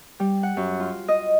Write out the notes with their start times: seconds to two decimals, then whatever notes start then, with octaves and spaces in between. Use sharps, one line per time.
0.20 G3
0.43 F#5
0.57 F#2
0.80 F4
1.08 D#5